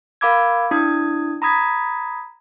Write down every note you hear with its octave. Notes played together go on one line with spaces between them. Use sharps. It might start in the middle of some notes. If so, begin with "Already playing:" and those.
A#4 F5 B5 D6 E6 G#6
D4 E4 D#6 G#6
A#5 B5 D#6 G#6 B6